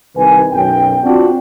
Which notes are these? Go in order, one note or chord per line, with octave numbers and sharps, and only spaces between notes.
C2 D#3 B4 G#5
B1 F#2 G5
C4 D4 F4 F#4